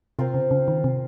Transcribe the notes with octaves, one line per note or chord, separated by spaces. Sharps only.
C3 C4 F4 A#4
C#3
C#3
D#3
C3